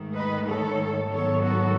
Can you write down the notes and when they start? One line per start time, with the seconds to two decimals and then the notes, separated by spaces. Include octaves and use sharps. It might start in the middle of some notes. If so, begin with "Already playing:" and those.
Already playing: G#2 D#3 A3
0.15 B4 D#5
0.47 A4 C#5
1.11 G#2 D#3 F#3 B3 A4 C#5
1.43 F#4 A4